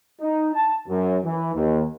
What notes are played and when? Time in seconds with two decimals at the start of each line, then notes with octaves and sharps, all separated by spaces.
0.20 D#4
0.54 A5
0.88 F#2
1.24 E3
1.54 D#2